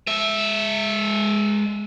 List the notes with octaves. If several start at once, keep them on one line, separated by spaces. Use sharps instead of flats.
G#3 E5